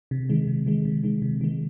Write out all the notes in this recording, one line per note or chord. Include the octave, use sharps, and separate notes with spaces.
C3
D#3 G#3
C3
D#3 G#3
C3
D#3 G#3
C3
D#3 G#3